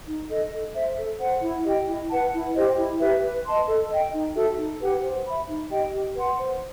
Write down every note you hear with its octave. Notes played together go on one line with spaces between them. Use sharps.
D#4
A4 D#5
A4
C5 E5
A4
C5 F#5
E4
G4 D#5 G5
E4
B4 F#5 A5
E4
G4 C5 D#5
E4
G4 B4 E5
B4
D#5 A5 C6
A4
D#5 G5
D#4
F#4 A4 E5
D#4
G4 B4 F#5
C5
E5 B5
D#4
G4 D#5 G5
G4
B4 F#5 C6
C5